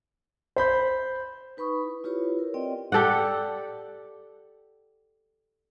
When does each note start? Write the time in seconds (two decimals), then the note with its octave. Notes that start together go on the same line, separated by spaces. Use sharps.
0.56 C5 B5 G6
1.57 D#4 B4 B5 C#6 D#6
1.84 E4
2.04 E4 F4 G4 B4 C#5
2.39 A#4
2.54 C4 D5 D#5 G5
2.92 G4 A4 D5 F#5